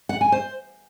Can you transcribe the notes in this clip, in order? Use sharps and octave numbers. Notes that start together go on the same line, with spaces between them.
F#5
G#5
C5